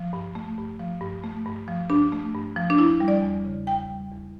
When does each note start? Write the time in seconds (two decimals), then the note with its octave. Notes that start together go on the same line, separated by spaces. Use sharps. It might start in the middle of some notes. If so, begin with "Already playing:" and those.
Already playing: F3
0.13 G2
0.35 A3
0.58 G2
0.80 F3
1.01 G2
1.24 A3
1.46 G2
1.68 F3
1.90 G2 D4
2.12 A3
2.34 G2
2.56 F3
2.70 D4
2.78 E2 E4
3.00 G3
3.08 D5
3.23 E2
3.45 C#3
3.67 E2 G5
3.89 G3
4.12 E2